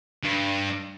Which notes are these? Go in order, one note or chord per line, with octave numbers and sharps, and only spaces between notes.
G2